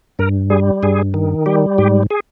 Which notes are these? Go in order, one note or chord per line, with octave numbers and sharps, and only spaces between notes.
G2 A#4
G3 G#4
G2 G#4
D#3
G3 G4
G#2 G4
G#4